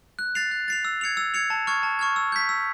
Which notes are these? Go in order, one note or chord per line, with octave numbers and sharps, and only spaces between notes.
F#6
A6 C7 F7
F#6
A6 C7 F7
E6
G#6 C#7 F7
E6
G#6 C#7 F7
A5
C#6 F6 G#6
A5
C#6 F6 G#6
E6
G6 B6
E6